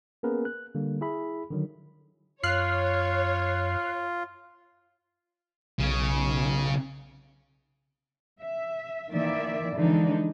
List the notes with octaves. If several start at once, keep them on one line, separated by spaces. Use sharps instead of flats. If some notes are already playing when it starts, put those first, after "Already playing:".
A#3 B3 C#4 G#4 A#4 B4
F#6
D3 G3 A#3
E4 G#4 E5 B5
D3 D#3 F#3
F#2 F4 C#5 F6 F#6 C7
B1 C#3
E5
D#3 E3 A#3 D5 E5
D3 E3 F3 G#3 D4 D#4